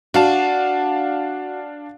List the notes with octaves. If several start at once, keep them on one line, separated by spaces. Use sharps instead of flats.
D4 F#4 F5 A5